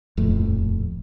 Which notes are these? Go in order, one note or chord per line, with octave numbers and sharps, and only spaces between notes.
D#1 F2 A2 A3